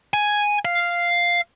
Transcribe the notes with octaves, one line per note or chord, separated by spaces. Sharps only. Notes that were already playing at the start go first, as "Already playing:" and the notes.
G#5
F5